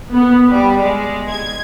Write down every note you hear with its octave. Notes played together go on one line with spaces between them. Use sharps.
B3
G3
G#3
G#6